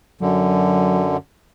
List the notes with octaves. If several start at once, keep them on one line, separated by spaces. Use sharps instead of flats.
F#2 D3 F#3